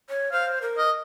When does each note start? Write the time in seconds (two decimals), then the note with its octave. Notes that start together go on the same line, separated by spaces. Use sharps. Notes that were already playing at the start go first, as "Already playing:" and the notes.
0.09 C#5
0.32 C5 F5
0.62 A#4
0.78 D#5